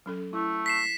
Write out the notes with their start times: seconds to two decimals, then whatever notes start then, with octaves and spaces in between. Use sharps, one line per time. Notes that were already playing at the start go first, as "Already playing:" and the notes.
0.06 F#3 C#4 A4
0.33 A3 E4
0.66 B6 C7 E7